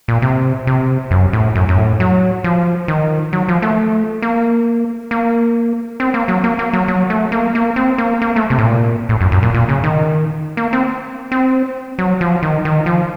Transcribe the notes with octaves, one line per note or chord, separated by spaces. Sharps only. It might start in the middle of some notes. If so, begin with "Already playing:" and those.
A#2
C3
C3
F#2
A2
F#2
F#2
A2
F#3
F3
D#3
F#3
F3
A3
A#3
A#3
C4
A#3
F#3
A#3
A#3
F#3
F#3
A3
A#3
A#3
C4
A#3
A#3
A3
C3
A2
A#2
A2
F#2
F#2
A#2
A#2
C#3
D#3
A#3
C4
C4
F#3
F3
D#3
D#3
F3